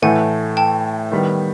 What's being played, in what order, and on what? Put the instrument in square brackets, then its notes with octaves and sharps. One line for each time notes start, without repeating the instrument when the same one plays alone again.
[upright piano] A2 E3 A3 [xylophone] F#5 G#5
[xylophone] G5 A5
[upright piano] D#3 G3 B3